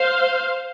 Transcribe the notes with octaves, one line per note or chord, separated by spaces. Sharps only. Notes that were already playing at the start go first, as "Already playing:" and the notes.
Already playing: C5 F5